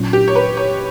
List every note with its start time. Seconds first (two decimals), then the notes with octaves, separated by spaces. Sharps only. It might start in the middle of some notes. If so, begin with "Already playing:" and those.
Already playing: A#2 F#3 C#4
0.13 G4
0.28 C#5
0.35 B4
0.57 C#5